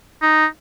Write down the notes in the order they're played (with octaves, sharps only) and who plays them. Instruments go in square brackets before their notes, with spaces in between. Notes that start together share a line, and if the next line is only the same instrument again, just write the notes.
[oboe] D#4